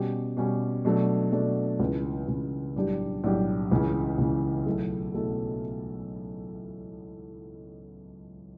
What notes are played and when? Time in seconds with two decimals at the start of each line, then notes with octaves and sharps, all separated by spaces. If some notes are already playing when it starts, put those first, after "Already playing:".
Already playing: B2 G3 C#4 G4
0.37 B2 G3 C#4 G4
0.85 B2 F#3 A3 D4
1.32 B2 F#3 A3 D4
1.80 C#2 C#3 E3
2.28 C#2 C#3 E3
2.76 B1 A2 G3 D4 G4
3.24 B1 A2 G3 D4 G4
3.71 C#2 C#3 E3
4.18 C#2 C#3 E3
4.66 B1 B2 A3 E4 A4
5.14 B2 A3 E4 A4